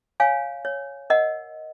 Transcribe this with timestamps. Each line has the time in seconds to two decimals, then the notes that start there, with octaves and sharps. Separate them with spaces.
0.20 C#5 F5 G#5
0.65 C#5
1.10 A#4 D#5 F#5